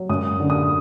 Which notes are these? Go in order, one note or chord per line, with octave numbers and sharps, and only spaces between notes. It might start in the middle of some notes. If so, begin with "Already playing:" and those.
Already playing: F#3
F#2 D#6
D3
D#6